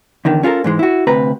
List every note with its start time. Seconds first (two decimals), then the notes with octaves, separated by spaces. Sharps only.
0.25 E2 D3 D#3
0.43 C#4 F4 G4 A4 A#4
0.64 G#2 E3 G#3
0.79 E4 F#4
1.07 D2 C3 B4 A#5